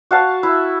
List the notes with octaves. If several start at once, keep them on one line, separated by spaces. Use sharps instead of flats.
F#4 F5 A5
E4